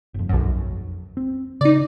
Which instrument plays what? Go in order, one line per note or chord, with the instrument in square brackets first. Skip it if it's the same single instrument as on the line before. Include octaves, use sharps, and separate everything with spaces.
[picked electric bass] G1 F2
[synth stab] B1 F#2
[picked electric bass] C4
[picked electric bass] C#3 [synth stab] D#4 D5